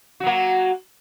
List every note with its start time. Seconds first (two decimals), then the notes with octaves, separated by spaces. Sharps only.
0.20 F#4
0.23 F#3
0.27 A#3